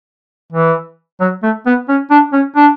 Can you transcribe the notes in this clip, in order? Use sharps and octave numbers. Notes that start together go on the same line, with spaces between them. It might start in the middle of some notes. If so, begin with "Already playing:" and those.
E3
F#3
A3
B3
C#4
D4
C#4
D4